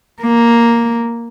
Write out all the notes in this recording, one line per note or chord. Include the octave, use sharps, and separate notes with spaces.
A#3